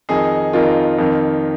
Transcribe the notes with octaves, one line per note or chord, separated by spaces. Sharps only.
F2 D#3 D#4 G#4
F2 D#3 F4 A#4
F2 D#3